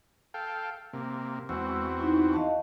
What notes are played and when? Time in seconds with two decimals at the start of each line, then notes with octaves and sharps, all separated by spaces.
0.34 A4 F5 G5
0.93 C3 A#3
1.49 E2 G#3 C4 F#4 E6
2.00 D#4 E4
2.34 D#5 F5 A5